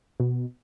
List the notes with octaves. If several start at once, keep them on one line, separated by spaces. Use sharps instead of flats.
B2